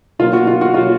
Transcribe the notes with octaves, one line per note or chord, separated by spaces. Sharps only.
B2 F#3 A#3 F4
F#4
F4
F#4
B2 F#3 A#3 F4